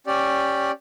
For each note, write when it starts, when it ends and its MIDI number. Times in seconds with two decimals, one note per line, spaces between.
0.07 0.71 61
0.07 0.71 67
0.07 0.71 74